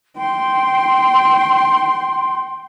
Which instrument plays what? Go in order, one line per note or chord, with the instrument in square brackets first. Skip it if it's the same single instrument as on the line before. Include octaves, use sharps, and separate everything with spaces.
[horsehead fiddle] G5 [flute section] C6